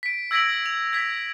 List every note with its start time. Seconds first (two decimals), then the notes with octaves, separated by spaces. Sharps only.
0.03 B6 D7
0.31 E6 G#6 A#6 B6 D7 F#7
0.66 F7
0.93 G#6 B6